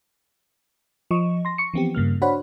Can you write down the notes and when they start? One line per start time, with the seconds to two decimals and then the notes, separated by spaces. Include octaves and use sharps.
1.11 F3 D#5 C#6
1.45 C6 A#6
1.58 C#6 C#7
1.74 E3 F3 B3 C4 G4
1.95 G2 C#3 A#3 F6
2.22 D4 F#4 C5 C#5 F#5 B5